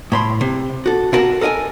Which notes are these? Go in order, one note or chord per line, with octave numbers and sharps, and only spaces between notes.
A2 B5 C6
C3
F#4 A4
C3 E4 F#4 A#4 A5
A4 A#4 D#5 G5 G#5